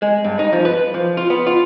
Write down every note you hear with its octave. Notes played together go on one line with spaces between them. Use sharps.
G#3
G2
D#4
F3
B4
F3
F4
B3
F4